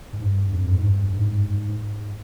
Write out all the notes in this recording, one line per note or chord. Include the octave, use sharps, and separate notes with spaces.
G#2
G2
F2
G#2
G2
G#2